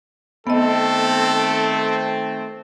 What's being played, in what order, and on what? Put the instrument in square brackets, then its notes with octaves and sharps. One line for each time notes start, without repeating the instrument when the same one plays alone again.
[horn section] D#3 A3 C4 [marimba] B3 D#5 [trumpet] A4